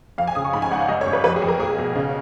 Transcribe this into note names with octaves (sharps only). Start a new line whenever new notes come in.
F2 F5
G#5
C#3 D#6
C#6
G#2 B5
G#5
G#1 F#5
F5
F#2 D#5
C#5
G#1
B4
F2 B4
G#4
F2
A#4
B1 G#4
B2
C#3